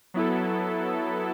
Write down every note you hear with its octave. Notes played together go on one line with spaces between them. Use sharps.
F#3 B3 E4 A4